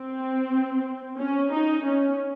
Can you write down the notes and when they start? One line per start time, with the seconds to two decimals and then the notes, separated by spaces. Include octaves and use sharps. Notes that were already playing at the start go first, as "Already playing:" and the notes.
Already playing: C4
1.18 C#4
1.52 D#4
1.85 C#4